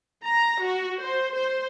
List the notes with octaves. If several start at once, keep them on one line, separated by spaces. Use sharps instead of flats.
A#5
F#4
C5
C5